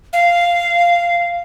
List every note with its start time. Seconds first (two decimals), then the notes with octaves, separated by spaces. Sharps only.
0.13 F5